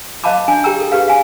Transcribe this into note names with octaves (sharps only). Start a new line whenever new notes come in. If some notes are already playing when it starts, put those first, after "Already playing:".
C5 D#5 F5 A5 B5 D6
D4 C#5 G#5
G4 G#4 G5 A#5 E6
A4
G4 G#4 B4 F5
F5 G#5